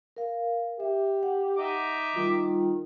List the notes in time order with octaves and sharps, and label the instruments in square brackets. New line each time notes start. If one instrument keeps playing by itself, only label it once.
[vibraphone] A#4 F5
[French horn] G4 [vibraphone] E5
[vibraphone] F#5
[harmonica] D#4 E5 D6
[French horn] D#3 [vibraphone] G3 F4